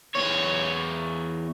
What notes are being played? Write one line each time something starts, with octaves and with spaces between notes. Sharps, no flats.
E2 C#5